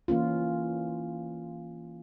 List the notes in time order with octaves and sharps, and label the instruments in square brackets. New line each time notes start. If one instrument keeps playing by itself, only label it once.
[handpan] E3 A#3 C#4 F4